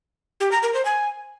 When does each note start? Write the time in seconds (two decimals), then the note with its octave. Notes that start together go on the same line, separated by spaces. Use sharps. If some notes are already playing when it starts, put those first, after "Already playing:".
0.40 G4
0.52 A#5
0.63 A#4
0.74 C5
0.85 G#5